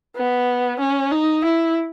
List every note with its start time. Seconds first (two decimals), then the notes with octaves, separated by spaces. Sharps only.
0.16 B3
0.80 C#4
1.12 D#4
1.44 E4